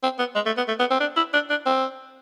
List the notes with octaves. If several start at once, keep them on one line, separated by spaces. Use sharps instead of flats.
C4
B3
G#3
A3
B3
A3
B3
C4
D4
E4
D4
D4
C4